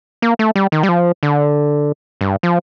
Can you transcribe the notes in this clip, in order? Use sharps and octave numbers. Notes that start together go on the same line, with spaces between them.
A#3
A3
G3
D#3
G3
F3
D3
G2
F3